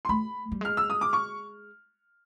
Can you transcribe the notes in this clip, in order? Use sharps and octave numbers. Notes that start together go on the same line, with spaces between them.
C6
A3 B5
G3
G#3 F6
E6
D#6
D6
C#6